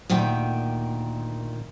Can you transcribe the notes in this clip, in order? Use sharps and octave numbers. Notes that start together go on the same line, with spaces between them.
D2 A#2 D#3 G5